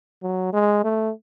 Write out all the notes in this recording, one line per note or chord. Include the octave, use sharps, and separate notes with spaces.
F#3
G#3
A3